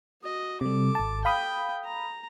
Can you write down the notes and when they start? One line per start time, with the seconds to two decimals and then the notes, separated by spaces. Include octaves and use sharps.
0.22 F#4 D#5
0.61 C3 G3 A4 D6
0.95 G#1 A5
1.25 F5 G5 B5 D#6
1.85 A#5